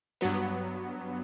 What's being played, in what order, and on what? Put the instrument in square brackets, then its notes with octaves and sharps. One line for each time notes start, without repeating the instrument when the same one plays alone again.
[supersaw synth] G2 F#3 B3